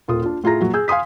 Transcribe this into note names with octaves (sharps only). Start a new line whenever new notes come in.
D#1 F4 A#4 D#6
D4 F4
A2 F4 G#4 A#5 A#6
A#2 F#3
G#4 E6 G6
F5 G#5 C6 D#6 B6